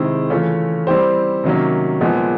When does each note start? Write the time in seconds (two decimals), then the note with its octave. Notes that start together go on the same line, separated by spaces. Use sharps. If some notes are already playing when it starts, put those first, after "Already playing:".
Already playing: C3 D#3 G#3 C4 E4
0.30 C#3 E3 A3 C#4 F4
0.87 G3 C4 E4 G4 C5
1.44 C3 D#3 F#3 A#3 C#4
2.01 A#2 F3 G#3 B3